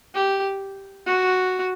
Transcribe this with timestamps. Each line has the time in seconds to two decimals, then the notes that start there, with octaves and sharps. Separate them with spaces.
0.15 G4
1.07 F#4